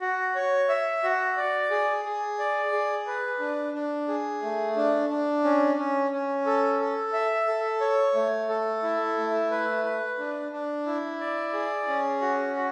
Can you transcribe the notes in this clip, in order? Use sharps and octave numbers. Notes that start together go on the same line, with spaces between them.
F#4
C#5
E5
F#4
D5
G#4
G#4
D5
G#4
B4
D4
D4
G#4
A3
D4
D4
C#4
C#4
C#4
A4
A4
E5
A4
C#5
A3
A4
E4
A3
B4
B4
D4
D4
E4
D5
G#4
C#4
F#4
F#4